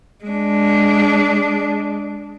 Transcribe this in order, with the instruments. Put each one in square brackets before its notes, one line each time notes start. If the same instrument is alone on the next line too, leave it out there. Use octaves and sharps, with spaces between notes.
[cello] G#3 D4